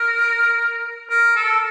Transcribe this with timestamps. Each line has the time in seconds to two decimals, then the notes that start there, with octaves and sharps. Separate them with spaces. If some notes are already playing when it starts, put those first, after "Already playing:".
Already playing: A#4
1.10 A#4
1.36 A4